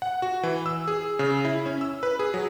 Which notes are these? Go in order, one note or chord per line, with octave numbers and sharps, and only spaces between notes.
F#5
F#4
E3
E6
G#4
C#3
E4
C#4
E6
B4
G#4
F#3